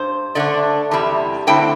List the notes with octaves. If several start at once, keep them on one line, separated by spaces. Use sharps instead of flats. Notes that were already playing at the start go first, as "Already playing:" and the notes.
Already playing: G2 C5
D3 A3 D4 D5
E2 C3 G3 E4
D3 A3 C4 E4 G5